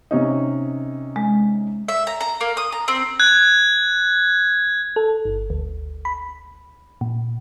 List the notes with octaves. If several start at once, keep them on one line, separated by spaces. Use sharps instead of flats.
C3 C#4 D#4
G#3
E5
A#5
A#5
A#3
D#6
A#5
C4
F#6 G#6
A4
G1
D2
B5
A#2